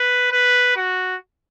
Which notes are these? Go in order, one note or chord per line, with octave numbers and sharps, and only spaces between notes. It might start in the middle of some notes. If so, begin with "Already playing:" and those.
Already playing: B4
B4
F#4